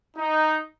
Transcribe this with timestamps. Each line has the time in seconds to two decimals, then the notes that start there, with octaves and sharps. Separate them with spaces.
0.17 D#4